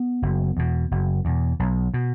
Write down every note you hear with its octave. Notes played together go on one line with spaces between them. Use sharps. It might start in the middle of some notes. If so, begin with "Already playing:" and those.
Already playing: B3
F#1
E2 B2
F#1
E2 B2
B1
B2